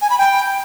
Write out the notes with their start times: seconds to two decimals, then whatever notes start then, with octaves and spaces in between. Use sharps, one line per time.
0.02 G#5
0.10 B5
0.18 G5